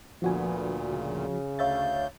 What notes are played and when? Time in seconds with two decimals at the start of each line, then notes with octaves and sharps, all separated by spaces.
0.22 D2 A#2 D3 F3 B3 F#4 G#5
0.89 C#3
1.59 D2 C#5 E5 F5 G6 A6